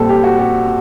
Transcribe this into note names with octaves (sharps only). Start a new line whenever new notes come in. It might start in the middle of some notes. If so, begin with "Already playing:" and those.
Already playing: A#1 A#2 G3 C4 A4
G4
F#4
G4